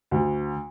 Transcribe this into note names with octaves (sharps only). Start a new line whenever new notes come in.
D2